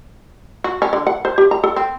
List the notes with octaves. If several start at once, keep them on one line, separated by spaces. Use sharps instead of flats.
F#4
C#4
D3
F#5
C5
G4
A#5
A4
C4